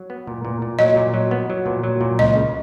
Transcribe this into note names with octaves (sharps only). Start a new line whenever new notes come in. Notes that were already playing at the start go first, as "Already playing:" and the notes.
Already playing: F#3
B3
A#2
A#2
A#2
F#3 D#5
A#2
F#3
B3
F#3
A#2
F#3
A#2
C#2 D#5
C#3